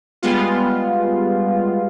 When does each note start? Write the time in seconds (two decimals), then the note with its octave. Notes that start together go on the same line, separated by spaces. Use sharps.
0.22 G3 G#3 B3 F4